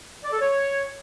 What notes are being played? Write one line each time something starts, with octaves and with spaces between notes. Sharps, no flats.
D5
A4
C#5